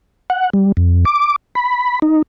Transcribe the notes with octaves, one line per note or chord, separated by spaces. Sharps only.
F#5
G3
F2
D6
B5
D#4